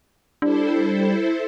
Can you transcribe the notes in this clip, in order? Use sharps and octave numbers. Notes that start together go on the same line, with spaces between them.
G3 D4 E4 A4 C5